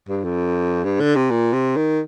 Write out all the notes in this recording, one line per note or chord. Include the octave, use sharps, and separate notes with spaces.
G2
F2
G2
D3
C3
A#2
C3
D#3